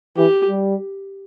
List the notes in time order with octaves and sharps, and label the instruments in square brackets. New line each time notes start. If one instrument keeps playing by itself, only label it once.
[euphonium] E3 [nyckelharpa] G4
[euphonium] G3